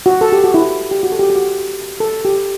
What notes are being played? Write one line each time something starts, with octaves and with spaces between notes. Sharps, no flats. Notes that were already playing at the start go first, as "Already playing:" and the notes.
F#4
A4
G4
F#4
E4
G4
F#4
A4
G4
G4
F#4
A4
G4